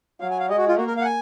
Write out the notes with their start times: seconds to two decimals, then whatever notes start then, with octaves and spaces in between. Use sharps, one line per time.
0.21 F#3 F5
0.31 G#5
0.40 F5
0.50 G#3 D#5
0.58 F#4
0.68 F4
0.77 A#3 F#4
0.87 A#4
0.97 F5
1.01 F#5
1.05 G#5